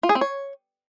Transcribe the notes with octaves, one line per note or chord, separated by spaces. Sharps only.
F4
G#4
C4
C#5